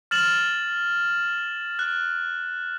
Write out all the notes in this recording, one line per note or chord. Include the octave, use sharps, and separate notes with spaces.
F6 A6 E7 F#7
F#6